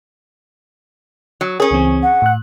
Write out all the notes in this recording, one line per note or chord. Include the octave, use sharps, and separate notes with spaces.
F#3
C#4 G#4 A#4 C#5
C#2 E3 C4
F#5
A2 F#6